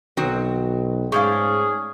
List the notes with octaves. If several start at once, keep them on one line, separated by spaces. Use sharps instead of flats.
B1 D#3 C4 F#4
G#2 A3 C#4 G#4 D5 F5